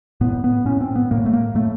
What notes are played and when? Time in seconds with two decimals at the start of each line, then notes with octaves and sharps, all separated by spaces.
0.21 A2 B3
0.44 B3
0.65 A2 C#4
0.81 C4
0.96 B3
1.11 A2 A#3
1.26 A3
1.33 A#3
1.55 A2 A3